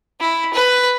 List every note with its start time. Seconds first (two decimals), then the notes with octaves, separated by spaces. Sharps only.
0.20 E4
0.53 B4